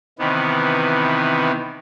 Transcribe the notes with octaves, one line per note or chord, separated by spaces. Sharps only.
C3 D#3 E3 B3